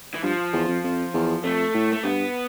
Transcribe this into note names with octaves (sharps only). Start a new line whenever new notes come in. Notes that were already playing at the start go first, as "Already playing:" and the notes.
E3
G2 F3
E2
F2
F2
E2
F2 A3
A2
A3
G2 B3